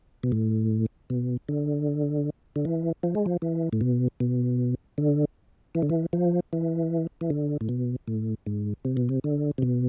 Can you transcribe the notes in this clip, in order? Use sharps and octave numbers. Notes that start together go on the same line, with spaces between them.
B2
A2
B2
D3
D3
E3
F3
G#3
F3
E3
A2
B2
B2
D3
E3
D3
E3
F3
E3
E3
D3
A2
B2
A2
G#2
C3
B2
C3
D3
C3
B2